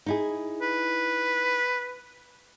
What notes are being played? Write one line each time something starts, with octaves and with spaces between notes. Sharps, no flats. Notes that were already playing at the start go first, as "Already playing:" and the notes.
D#4 E4 G#4
B4